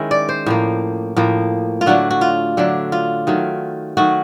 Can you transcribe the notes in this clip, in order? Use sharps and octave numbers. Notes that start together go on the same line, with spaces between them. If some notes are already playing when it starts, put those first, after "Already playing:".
Already playing: D#3 G#3 C#4 E4
D5
C5
A2 F3 A#3
A2 F3 A#3
F4
D3 F#3 A3 D4 F#4
F#4
F4
D3 F#3 A3 D4
F4
D#3 F#3 A3
D#3 F#3 A3 F#4